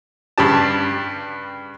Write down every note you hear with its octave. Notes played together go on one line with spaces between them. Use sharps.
G2 C#3 G4 A5